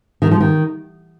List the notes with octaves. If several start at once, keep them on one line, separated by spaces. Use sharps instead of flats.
D#3
F3
D#3